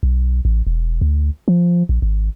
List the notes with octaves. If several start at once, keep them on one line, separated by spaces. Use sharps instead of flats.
B1
A1
E1
D2
F3
A#1
G#1